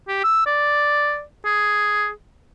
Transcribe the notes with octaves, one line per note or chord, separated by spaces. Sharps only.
G4
E6
D5
G#4